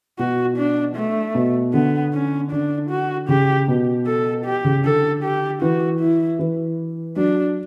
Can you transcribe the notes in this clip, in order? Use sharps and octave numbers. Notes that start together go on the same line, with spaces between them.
B2 F#4
D4
A3
B2
D3 B3
C#4
D3 D4
F#4
C#3 G4
B2
A4
G4
C#3
D3 A4
G4
E3 F#4
E4
E3
F#3 D4